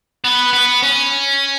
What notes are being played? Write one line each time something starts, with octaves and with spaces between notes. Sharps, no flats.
B3
B3
C#4